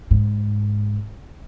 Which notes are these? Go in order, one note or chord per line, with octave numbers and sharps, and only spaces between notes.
G#2